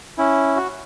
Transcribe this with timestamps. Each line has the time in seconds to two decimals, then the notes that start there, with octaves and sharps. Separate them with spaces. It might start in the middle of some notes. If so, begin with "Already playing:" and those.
0.18 C#4 E4
0.56 F#4